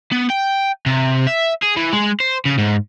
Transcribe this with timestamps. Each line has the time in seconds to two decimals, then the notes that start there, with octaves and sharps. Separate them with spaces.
0.12 B3
0.30 G5
0.86 C3
1.27 E5
1.62 G#4
1.76 E3
1.93 G#3
2.20 C5
2.45 C#3
2.58 G#2